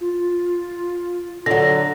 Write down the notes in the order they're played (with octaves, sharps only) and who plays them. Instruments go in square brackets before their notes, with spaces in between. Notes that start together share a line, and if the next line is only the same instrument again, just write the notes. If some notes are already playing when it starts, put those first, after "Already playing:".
[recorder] F4
[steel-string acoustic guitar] D3 F#3 [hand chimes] A#6